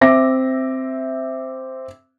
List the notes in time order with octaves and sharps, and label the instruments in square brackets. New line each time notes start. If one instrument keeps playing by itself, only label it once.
[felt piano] C4 E5 D6 A#6